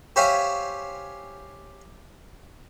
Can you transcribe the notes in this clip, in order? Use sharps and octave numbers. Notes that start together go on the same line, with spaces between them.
G4 C5 C#5 E5 F5 G#5